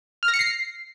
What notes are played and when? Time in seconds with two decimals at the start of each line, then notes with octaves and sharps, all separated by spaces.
0.23 F6
0.28 A#6
0.34 C#7
0.39 C7